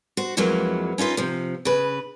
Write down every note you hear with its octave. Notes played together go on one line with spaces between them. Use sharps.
F#4 C5
F2 E3 F#3 G#3 A#3 B3
C#4 D#4 F4 B4
C3 F3
C#3 B4